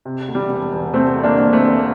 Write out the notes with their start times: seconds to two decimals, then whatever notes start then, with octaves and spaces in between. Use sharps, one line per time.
0.05 C3
0.28 D2
0.35 G3
0.49 E1
0.73 E1
0.94 C3 A3 C4
1.16 D2
1.24 A#3 D4
1.38 E1
1.53 A3 C4
1.61 E1